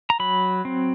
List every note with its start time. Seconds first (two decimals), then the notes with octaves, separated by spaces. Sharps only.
0.10 A#5
0.20 F#3 B5
0.65 C4